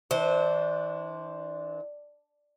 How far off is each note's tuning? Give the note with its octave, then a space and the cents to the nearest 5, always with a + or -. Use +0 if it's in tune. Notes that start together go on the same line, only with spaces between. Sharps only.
E3 -35 D4 +0 C5 -5